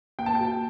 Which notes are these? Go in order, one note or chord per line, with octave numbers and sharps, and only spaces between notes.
A#3 G5
A5
G5
F#4